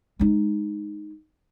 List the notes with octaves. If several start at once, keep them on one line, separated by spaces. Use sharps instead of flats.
G#3 D#4